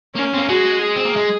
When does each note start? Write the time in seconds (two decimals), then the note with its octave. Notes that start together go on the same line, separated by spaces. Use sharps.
0.15 A#3 C#4
0.33 C4
0.37 A#3
0.48 G#3 F#4
0.82 G#4
0.96 C4
1.05 A#3
1.16 G#3